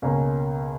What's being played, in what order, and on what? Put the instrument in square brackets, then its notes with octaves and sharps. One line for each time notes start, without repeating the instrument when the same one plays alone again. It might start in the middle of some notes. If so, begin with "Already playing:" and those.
[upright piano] C#2 B2 A#3 C#4